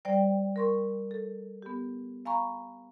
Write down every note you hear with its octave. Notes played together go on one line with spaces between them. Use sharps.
G3 C5 D5 G5
A#4 C6 C#6
A4
B3 G4
F5 G#5 A#5 B5 C#6